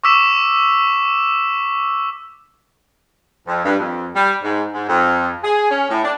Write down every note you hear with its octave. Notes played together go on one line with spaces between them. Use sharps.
C#6 D6 E6 B6 E7
F2
G2
F2
G3
G#2
G#2
F2
G#4
C#4
A2
D4